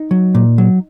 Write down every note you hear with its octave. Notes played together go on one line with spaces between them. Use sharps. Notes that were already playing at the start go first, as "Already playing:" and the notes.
Already playing: D#4
F#3
A#2
F#3